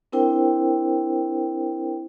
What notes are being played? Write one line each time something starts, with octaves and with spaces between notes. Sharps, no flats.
C4 D4 E4 A#4 C5 G5